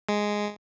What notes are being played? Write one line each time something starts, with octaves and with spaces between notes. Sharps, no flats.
G#3